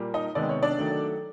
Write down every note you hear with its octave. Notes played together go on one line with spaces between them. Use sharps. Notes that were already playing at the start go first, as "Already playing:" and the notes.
Already playing: A#2 G3 A#3
D#4 D#5
C3 D#3 G#3 B3 D5
C#5
D4 D5
D#3 F#3 A3